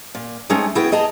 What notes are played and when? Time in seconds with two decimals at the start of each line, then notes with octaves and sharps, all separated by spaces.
0.15 A#2
0.49 G#3 A3 C4 C#4 D#4 G#4
0.75 B3 E4 F#4 G#4 G5
0.92 G#4 D#5 G5 A5 A#5